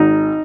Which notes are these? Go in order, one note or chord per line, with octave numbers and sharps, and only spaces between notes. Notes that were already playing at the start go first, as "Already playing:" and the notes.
Already playing: G#1 D#4